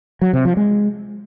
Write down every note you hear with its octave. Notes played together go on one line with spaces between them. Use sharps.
F#3
C3
F3
G#3